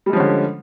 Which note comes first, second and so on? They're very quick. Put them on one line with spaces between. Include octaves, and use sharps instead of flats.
G3 G#3 F3 C#4 D3